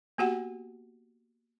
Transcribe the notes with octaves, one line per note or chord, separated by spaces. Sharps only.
A#3 B3 F#4 G4 F#5